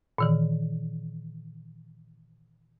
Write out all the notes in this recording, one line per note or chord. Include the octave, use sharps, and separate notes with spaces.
A#2 D#3 E3